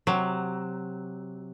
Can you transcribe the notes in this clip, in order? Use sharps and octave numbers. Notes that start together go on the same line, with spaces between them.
C3 F#3